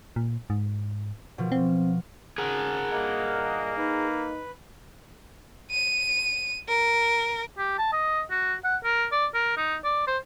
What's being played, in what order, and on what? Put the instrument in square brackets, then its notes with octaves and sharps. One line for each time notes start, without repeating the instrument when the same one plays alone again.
[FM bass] A#2
G#2
[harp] B2 F3
[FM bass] C4
[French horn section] C#3 [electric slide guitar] G#4 A#4 [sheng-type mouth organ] F#5
[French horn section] G2 A#2 D#5 [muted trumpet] A#3
[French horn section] D#4 [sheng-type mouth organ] B4
[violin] D#7
A#4
[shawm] G4
A5
D#5
F#4
F#5
A#4
D5
A#4
D#4
D5
C5